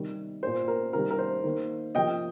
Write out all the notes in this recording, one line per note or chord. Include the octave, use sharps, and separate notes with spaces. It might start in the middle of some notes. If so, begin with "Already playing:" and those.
Already playing: C3 D#3 G3
A#2 A#3 C5
A#4
C3 D#3 G3 A#4
A#4
C5
D#3 A#3
C3 F3 A#3 D#5 G5